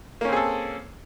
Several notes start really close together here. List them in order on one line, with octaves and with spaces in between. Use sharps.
A#3 C#4 C4 G#4 A4